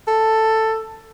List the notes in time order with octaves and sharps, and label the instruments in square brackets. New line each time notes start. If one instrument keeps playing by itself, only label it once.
[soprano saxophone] A4